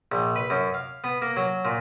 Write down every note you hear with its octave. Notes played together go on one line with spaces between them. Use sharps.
A#1
B4
F#2
F5
B3
A#3
F#3
A#2